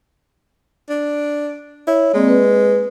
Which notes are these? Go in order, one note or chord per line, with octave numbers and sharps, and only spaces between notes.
D4
E4 C#5
G#3 A#3 C4 D5
B4